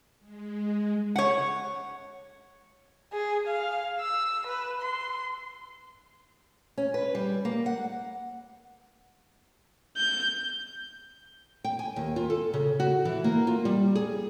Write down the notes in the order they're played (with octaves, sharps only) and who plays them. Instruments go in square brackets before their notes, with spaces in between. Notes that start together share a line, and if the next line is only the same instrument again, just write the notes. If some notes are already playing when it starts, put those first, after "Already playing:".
[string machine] G#3
[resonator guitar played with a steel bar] C#5 F#5
[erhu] G#4
F5
E6
B4
C6
[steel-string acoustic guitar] C#4
B4
G3
A#3
F#5
[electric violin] G6
[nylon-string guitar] G5
G#5
D#2
F4
A4
C#3
F#4
E3
A#3
F4
G3
G#4